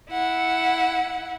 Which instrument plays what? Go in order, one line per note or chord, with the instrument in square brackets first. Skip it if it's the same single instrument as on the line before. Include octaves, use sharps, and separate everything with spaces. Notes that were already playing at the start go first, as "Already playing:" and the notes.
[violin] E4 F#5